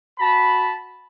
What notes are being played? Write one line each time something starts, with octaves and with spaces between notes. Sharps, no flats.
F#4 A5 B5